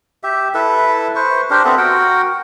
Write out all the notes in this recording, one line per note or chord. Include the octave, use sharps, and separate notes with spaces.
G4 E5
E4 A4 B4 E5
B4 C5 C#6
D4 G4 A#4 C5
B3 C4 A4 E5
F#4 A#4 F#5 G5